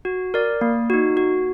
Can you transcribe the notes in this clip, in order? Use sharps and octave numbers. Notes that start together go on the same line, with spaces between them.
F#4
A#4 D5
A#3
D#4 F#4
F#4